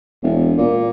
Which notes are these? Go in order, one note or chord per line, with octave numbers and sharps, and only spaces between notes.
E1
A#2